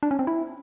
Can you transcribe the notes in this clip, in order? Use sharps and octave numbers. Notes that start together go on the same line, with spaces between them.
D4
C#4
C4
E4